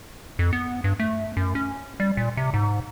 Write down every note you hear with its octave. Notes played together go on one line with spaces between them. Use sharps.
F2
B3
G2
A3
F#2
C#4
G3
A#2
C3
G#2